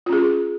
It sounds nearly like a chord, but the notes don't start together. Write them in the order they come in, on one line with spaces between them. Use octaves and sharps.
F4 C#4 G#4